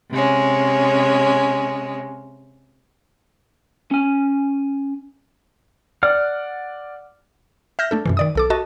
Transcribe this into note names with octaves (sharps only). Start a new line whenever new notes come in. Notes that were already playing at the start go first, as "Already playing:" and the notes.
C3 G#3 C#4
C#4 G#5
D5 F#5 F6
E5 F6 G6 A#6
A3 D4 A4
F#2 B2 E3
D#3 D5 D#6
B1 A4 D6
F#4 A4 D#5 A5